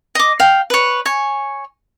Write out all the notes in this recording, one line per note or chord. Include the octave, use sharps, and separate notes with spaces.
D#5 D6
F5 G5
B4 C#5
C#5 G#5